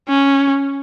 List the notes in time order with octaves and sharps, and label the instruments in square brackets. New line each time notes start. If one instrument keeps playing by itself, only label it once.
[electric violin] C#4